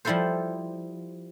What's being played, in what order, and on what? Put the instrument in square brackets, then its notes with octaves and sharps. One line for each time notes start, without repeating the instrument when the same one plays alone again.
[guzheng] F3 G3 E4 F4 A4 C5